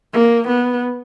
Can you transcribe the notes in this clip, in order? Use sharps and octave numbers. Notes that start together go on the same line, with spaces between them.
A#3
B3